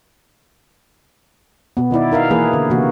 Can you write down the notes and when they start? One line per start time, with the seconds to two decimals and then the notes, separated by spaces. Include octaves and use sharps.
1.77 B2 B3
1.91 D#3 D#4 E4 D5
2.11 D#4 A#4 E5 F5
2.30 E3 A#3 G#4 B4
2.53 D3
2.70 C3 E3 A#3 F#4